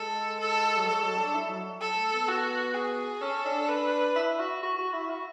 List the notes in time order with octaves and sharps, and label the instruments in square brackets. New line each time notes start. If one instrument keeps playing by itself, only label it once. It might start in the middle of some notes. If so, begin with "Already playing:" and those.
Already playing: [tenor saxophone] G#3 [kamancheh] A4
[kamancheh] A4
[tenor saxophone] F#3
[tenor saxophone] G#3 [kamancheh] A4
[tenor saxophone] F#3
D4
E4
F#3
[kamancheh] A4
[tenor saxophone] A3
B3
[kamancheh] F#4
G#4
[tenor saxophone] C#4 [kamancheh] A4
[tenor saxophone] D4
[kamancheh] B4
[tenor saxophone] E4
F#4
F#4
F#4
E4
F#4